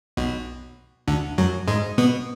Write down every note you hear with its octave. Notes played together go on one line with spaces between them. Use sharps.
B1 B2
D2 D3
F#2 F#3
G#2 G#3
B2 B3